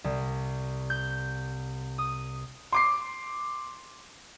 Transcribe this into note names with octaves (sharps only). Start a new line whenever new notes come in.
C2
G6
D#6
C6 D6 C7